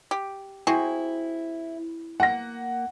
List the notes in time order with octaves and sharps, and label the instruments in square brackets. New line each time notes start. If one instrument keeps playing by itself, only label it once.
[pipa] G4
[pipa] C4 F#4 G#4 [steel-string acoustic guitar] E4
[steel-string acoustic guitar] A#3 [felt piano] F#5 A#6